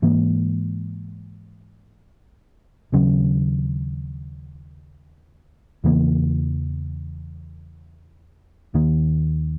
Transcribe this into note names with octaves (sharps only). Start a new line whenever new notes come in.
G#2 E3 A#3
D#2 C#3 F#3 C#4
E2 C#3 E3 A#3
D#2 D#3 A#3